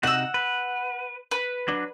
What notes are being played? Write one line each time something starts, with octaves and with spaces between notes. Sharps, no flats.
C3 D#4 F#4 F#5 E6
B4
B4
F#3 D4